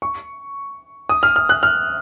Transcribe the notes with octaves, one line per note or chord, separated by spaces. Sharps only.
C#6
D#6
F6
F6
F#6
F6